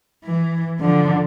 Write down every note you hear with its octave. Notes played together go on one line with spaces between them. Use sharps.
E3
D3 F3